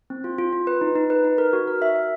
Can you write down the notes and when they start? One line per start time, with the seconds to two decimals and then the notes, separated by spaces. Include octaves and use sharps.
0.10 C4
0.24 F4
0.38 F4
0.53 F4
0.67 B4
0.81 D#4
0.95 D#4
1.10 B4
1.24 D#4
1.38 A#4
1.53 F#4
1.67 A#4
1.82 E5
1.96 E5